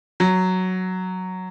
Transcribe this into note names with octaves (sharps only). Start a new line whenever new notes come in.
F#3